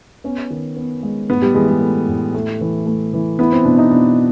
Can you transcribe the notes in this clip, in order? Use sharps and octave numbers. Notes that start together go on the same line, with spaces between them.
B3 C#4
D#3
B3
G#3
A2 B3
G3
E3 G#3
G#3
A3
A2
A3
E3
A3
E3
B3 E4
C4
B2 D4
D#4
B2 D4